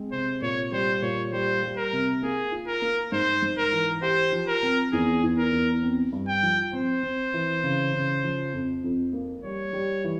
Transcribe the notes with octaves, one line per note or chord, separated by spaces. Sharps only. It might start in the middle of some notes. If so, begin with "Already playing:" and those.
Already playing: G#3 C4
C3 C5
A#2 C#5
G3 C5
A#2 C#5
G3 C5
G3
A#4
C3
A#3 G#4
F4
A#4
A#3
G#2 C5
G#2
A#4
E3
G4 C5
F3
A#4
C4
E2 G#4
E2
A#4
E2
C4
G2
G5
F3
C4 C5
C4
E3
C#3
C#3
F3
F2
F2
A#3
G3 C#5
G3
E3